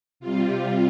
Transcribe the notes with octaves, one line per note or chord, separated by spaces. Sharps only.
C3 G3 F4